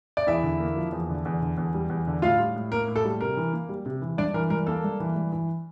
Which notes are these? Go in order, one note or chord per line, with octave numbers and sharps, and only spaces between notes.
D5
E2 E4 E5
D3
A#3
F3
E2
D3
E2
D3
E2
G3
E2
D3
A2 F4 F5
G3
A2
A#3 A#4
A2
A4
G3
C3 A#4
E3
A#3
G3
C3
E3
G2 D4 D5
E3 A#4
G2 A#4
A#3 A4
G2
E3
G2
E3